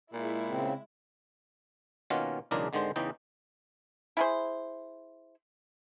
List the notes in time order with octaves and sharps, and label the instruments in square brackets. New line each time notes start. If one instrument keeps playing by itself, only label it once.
[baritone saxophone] A#2 [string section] G#3 E4
[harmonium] C#3 C4
[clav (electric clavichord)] B2 D#3 A#3 C#4 F4 F#5
B1 E2 C#3 G#3 D4 A#4
G#1 D3 D#3 G#3 C5
E2 C#3 E3 D#4 G5
[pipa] E4 G#4 C5